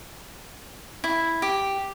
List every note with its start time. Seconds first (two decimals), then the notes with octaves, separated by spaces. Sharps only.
1.04 E4
1.42 G4